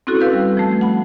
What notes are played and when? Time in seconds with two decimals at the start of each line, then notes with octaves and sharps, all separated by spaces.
0.07 C4 C#4 E4 F#4 A4
0.21 B4 F5 E6 G6
0.33 G3
0.57 F3 A3
0.81 F#5 B5